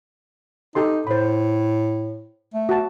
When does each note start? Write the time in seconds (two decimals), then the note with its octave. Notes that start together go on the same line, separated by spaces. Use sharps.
0.75 D#4 G4 A4 C6
1.07 A2 C5 B5
2.54 A3
2.69 F#4 A5